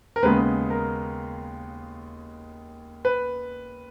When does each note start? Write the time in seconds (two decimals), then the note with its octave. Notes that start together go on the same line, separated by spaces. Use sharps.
0.16 A#4
0.22 D#2 C#3 G#3 B3 B4
0.70 A#4
3.05 B4